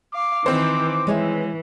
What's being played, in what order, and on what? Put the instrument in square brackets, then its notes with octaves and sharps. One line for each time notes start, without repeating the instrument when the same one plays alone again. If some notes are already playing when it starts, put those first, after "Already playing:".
[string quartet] F5 [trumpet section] D6
[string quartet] D#3 E3 [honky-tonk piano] C4 C5
[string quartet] E3 [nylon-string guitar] G#3 C#5 E5